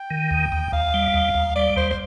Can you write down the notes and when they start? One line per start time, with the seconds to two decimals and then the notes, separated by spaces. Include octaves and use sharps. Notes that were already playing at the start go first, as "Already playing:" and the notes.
Already playing: G5
0.10 D#3
0.31 D#2
0.52 D#2
0.72 D#2 F5
0.94 G3
1.14 D#2
1.35 D#2
1.56 G3 D5
1.76 D#2 C5
1.90 C5